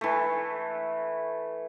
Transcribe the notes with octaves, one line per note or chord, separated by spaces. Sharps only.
E3 A3